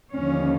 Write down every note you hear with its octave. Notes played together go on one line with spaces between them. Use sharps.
D#2 D3 F3 C#4